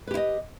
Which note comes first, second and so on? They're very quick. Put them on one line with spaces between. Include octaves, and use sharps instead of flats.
B4 G4 E4 D#5